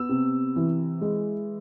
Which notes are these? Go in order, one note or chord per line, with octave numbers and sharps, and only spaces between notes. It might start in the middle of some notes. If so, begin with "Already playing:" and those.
Already playing: B3 E6
C3
E3
G#3